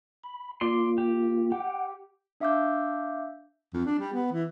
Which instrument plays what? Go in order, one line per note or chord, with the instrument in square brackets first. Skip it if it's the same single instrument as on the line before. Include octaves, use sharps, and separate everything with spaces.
[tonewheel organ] B5
[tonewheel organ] A#3 F4 [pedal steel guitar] D5 C6
[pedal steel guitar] G4
[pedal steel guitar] G4 [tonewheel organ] F#5 G5
[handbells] D4 E5 F5 D6 E6 G6
[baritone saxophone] F2
D4
G3
B3
E3